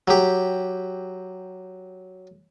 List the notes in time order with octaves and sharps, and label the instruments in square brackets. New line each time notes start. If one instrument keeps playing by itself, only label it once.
[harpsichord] F#3 G4